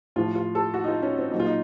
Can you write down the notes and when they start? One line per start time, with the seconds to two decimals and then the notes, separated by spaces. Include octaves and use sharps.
0.16 A2 F3 F4
0.35 F4
0.55 A4
0.74 F#4
0.84 D#4
0.88 F4
1.02 C#4
1.18 C4
1.31 A#2 F#3 D#4
1.40 F4
1.46 D#4